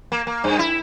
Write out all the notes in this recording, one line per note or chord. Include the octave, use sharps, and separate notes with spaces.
A#3
A#3
G2
E4